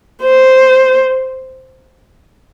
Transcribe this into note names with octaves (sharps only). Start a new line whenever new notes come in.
C5